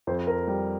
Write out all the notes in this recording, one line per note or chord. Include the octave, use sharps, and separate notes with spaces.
F2 C5
A#4
G3